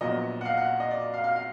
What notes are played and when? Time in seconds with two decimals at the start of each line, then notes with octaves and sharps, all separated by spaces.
0.01 A#1 A#2 F#3 B3 D#5
0.41 F#5
0.45 F5
0.57 F#5
0.80 D#5
0.91 D5
1.14 F5
1.24 F5
1.36 F5